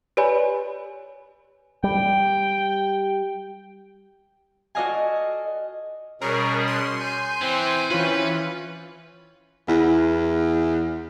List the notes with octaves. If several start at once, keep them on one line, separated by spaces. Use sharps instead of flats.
G4 B4 C#5 D5 G#5 B5
G3 G5
F#4 A4 D5 D#5 F5 G#5
B2 G3 C#4 G#4 A#4
C6
G#5 G6
E3 C4
E3 C#4 F4 B4
E2 E4